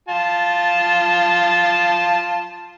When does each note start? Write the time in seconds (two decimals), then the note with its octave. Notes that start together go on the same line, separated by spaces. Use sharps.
0.08 F4 A5